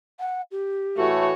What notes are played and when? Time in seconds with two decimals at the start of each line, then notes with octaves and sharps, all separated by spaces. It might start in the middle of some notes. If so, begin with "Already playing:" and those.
0.20 F#5
0.51 G4
0.97 A2 E3 A3 F#4 C#5